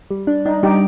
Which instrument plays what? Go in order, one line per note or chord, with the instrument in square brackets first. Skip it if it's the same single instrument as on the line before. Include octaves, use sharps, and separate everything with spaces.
[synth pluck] G3
D4
[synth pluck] D4 [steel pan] D#4
[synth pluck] G3 [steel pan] D#4 G4